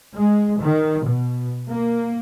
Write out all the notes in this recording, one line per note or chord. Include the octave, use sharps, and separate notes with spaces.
G#3
D#3
B2
A#3